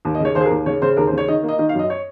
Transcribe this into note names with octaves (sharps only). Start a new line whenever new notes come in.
D#2
D#5
C#3 C#5
D#2 C5
G#4
A#4
D#2
C#3 C#5
C#3 C5
D#2 A#4
C5
C#3 C#5
D#3 D#5
A#3
D#5
D#3 D#5
F5
F#2 D#5
C#5